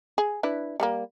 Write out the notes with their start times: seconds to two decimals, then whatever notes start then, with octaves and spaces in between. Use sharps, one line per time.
0.18 G#4
0.43 D4 E4 B4
0.80 G3 G#3 A#3